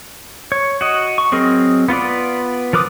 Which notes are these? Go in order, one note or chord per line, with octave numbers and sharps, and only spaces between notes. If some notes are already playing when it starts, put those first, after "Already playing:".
C#5
F#4 D#5
C#6
F#3 C4 G#4 A#4 D#5
B3 F4 B4 D5
F3 A#4 B4 D6 D#6